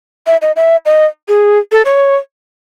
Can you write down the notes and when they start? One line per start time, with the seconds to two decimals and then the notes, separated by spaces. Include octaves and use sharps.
0.27 E5
0.42 D#5
0.56 E5
0.85 D#5
1.28 G#4
1.72 A4
1.85 C#5